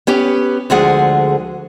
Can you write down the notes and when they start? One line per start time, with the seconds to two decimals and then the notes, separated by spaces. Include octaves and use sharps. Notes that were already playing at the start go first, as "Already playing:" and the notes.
0.07 B3 C#4 G4
0.70 D2 D3 F3 G#3 G#4 F#5